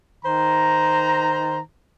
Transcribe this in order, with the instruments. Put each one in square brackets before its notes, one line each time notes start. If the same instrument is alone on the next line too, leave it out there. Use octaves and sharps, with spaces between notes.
[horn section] D#3 C5 A#5